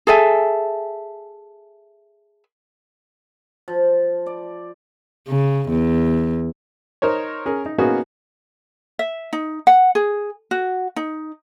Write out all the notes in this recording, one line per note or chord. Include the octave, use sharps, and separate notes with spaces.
G#4 A4 E5 G#5
F3
D5
C#3
E2
D#4 A#4 C5 C#5
C#4 G#4 A#4
D#4
A#3 B3 C#4 D#4 F#4 G#4
E5
D#4
F#5
G#4
F#4
D#4